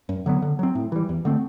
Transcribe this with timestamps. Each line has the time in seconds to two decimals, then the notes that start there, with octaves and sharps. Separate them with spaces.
0.09 F#2
0.26 D3 F#3 B3
0.42 D3
0.59 F#3 C4
0.75 A2
0.92 E3 G3
1.09 E2
1.25 D3 A3 C4